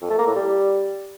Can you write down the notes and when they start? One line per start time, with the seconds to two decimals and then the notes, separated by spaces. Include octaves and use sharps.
0.02 F2
0.10 A3
0.19 A#3
0.27 A2
0.35 G3